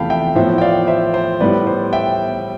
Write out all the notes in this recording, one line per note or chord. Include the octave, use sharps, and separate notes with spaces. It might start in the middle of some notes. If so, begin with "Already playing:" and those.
Already playing: E2 C3 F3 A3 F5 G5 A5 B5
E5 G5
A2 F3 B3 C5 E5
G5
D5 F5
C5 E5
C5
A2 G3 B3 B4 D5
C5
E5 G5